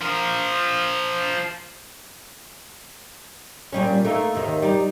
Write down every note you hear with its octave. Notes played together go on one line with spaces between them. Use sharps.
F3 A#4
A#2 G3 C#4
A3 A#3 D#4
D#2 C3 D#3
G3 D#4